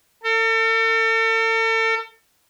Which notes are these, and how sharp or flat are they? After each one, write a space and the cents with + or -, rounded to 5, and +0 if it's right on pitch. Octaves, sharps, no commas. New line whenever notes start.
A4 +40